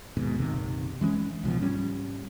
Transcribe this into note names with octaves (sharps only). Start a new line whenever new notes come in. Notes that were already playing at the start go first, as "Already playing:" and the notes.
D#2 G#2 B2
F#1 B1 C3 D#3
E3 G#3 B3 C#4
C2 B2 D3 F3
G#2 G3 C#4